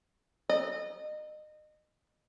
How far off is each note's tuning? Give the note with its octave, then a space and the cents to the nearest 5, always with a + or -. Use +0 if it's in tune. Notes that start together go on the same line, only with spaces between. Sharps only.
D#5 -30